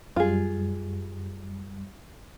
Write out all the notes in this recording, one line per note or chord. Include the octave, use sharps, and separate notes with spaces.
F#2 G3 F4 G#4